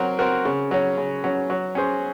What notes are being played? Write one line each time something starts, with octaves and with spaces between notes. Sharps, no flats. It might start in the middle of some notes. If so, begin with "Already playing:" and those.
Already playing: F#3 C4 F#4 A#4
C4 F#4 A#4
C#3
F#3 C#4
C#3
F#3 C#4
F#3
C#4 G#4 C5